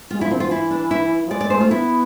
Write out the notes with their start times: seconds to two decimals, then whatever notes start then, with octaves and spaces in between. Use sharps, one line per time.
0.11 G#3 F4
0.20 F3 E4
0.30 D3 C4
0.40 E3 F4
0.51 E4
0.71 D4
0.91 E4
1.25 F3
1.30 G#3 D5
1.41 D5
1.44 G#3
1.50 C5
1.57 A3 F4
1.70 B3 E4